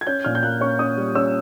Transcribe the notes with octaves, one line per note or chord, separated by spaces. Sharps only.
G#6
C#4 G6
A#2 F6
G6
A#3 F#6
C#4 C#6
C#4 D#6
G3
C#4 E6